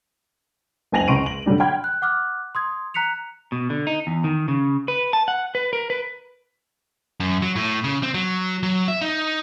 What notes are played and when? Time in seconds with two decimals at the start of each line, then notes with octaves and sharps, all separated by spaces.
0.92 F#1 C#2 G#5 A#6 F7 F#7
1.08 C#2 C#3 C6 C#6 D7 D#7
1.26 F#7
1.46 D3 F#3 G3 D4
1.60 F#5 G5 B5 C6 F6 G#6
1.84 F#6
2.02 F#5 D6 F6 F#6
2.55 C6 D#6 G#6
2.94 A#5 F#6 B6 C#7 F7
3.52 B2
3.70 D3
3.87 D#4
4.07 E2
4.24 D#3
4.48 C#3
4.88 B4
5.13 A5
5.28 F#5
5.55 B4
5.73 A#4
5.90 B4
7.20 F#2
7.42 F#3
7.56 A2
7.84 C#3
8.03 C4
8.14 F#3
8.63 F#3
8.88 E5
9.01 D#4